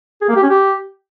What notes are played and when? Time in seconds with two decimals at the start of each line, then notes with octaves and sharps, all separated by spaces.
0.22 G#4
0.29 A#3
0.36 G4
0.43 C#4
0.50 G4